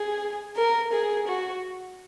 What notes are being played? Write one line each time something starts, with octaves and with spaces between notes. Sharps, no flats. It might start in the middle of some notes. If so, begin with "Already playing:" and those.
Already playing: G#4
A#4
G#4
F#4